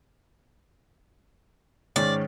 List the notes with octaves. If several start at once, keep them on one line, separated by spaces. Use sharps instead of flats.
G#2 D#3 C#4 D5